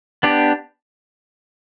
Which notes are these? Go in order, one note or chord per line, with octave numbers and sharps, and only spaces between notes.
B3 D4 G4